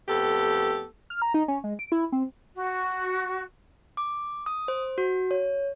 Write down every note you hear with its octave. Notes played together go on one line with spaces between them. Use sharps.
F2 A3 B3 G4 A4
F6
A#5
D#4
C#4
G#3
D7
E4
C4
F#4
D6
D#6
C5
F#4
C#5